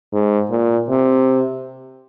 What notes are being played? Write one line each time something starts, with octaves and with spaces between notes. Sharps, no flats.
G#2
A#2
C3